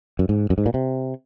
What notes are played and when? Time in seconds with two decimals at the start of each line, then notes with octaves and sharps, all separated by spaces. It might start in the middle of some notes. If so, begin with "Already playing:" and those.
0.19 F#2
0.29 G#2
0.50 F#2
0.58 G#2
0.66 A#2
0.74 C3